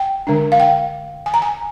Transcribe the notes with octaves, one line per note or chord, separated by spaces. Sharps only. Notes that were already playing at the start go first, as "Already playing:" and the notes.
Already playing: G5
D3 G#3 D4
F5
G5
G#5
A#5
G#5